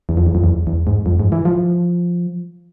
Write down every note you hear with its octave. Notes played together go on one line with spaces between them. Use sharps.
E2
F2
E2
F2
E2
E2
G#2
F2
G#2
E3
F3